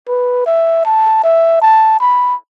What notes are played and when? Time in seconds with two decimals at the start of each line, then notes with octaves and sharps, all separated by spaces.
0.08 B4
0.46 E5
0.86 A5
1.24 E5
1.62 A5
2.00 B5